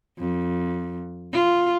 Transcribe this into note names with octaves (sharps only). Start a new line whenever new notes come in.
F2
F4